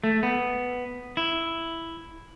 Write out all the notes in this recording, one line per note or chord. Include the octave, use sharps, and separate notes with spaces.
A3
B3
E4